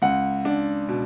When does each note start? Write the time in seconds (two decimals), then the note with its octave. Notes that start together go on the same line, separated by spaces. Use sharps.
0.02 C#2 F#5
0.45 D4
0.88 B2